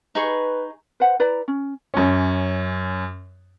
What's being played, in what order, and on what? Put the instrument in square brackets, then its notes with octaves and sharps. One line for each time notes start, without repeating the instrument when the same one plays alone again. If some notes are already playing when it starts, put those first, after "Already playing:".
[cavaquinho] D#4 G#4 C#6 [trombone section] B4
[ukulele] B4 C5 F#5
E4 B4 D5 A#5
C#4
[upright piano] F#2 C#4